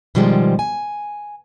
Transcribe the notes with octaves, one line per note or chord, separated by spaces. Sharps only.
B2 D#3 F3 G3 G#3
G#5